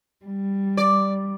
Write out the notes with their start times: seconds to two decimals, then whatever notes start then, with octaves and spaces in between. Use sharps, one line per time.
0.25 G3
0.77 D5